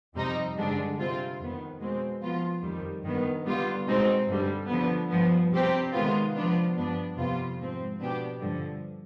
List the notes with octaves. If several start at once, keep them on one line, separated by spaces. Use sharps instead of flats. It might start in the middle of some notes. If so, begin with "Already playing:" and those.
F2 C3 G3 C4 D#4
G2 D3 G#3 D4
C3 G3 C4 F4
F2 D#3 B3
B2 G#3 C4
F3 B3 F4
F2 D#3 G3
G2 D#3 B3
D3 G3 B3 F4
B2 G#3 C4 D#4
G2 D3 G3
D3 F3 B3
G2 F3 B3
C3 G3 C4 G4
C3 D#3 G#3 B3 F4
F3 B3 D4 F4
G2 F3 B3 D4
F2 C3 G3 B3 F4
G#2 F3 C4
B2 B3 D4 G4
G2 D3 F3